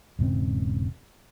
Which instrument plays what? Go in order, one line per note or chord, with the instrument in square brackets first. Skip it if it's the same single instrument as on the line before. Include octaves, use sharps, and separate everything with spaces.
[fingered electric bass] E1 G#2 C#3 C4